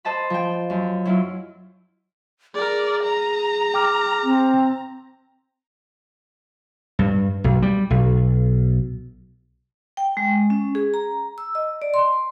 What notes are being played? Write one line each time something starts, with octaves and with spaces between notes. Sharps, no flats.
C5 D#5 A5 B5
F3 G5
F#2
F#3 E4 F4
G#4 A#4 D5
A#5
G5 D6 F6
C4
G2
B1
G3
B1
G5
G#3
C#4
G#4
A#5
E6
D#5
D5
C6